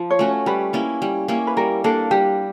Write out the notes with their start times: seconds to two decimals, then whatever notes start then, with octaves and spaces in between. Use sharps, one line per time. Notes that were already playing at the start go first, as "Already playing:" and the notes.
Already playing: F3
0.11 C#5
0.19 A3 C#4 F#4
0.46 G3 B4
0.73 A#3 C#4 E4
1.02 G3
1.28 A#3 C#4 E4
1.47 B4
1.57 G3 A#4
1.84 A#3 D4 A4
2.11 G3 G4